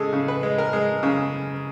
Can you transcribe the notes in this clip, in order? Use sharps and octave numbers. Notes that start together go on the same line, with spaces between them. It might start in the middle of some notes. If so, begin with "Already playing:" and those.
Already playing: C#3 G#3 G#4 A4
C#3
B4
G#3
A#4
G#3
C#3